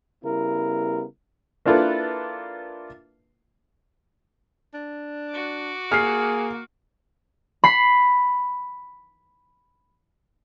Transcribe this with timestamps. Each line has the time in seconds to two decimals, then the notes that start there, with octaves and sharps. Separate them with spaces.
0.24 C#3 G3 B3 E4 A#4
1.66 A#3 D4 E4 F4 A4 B4
4.74 D4
5.30 F#4 D6
5.91 A#3 G#4 F6 C7
7.64 B5 C7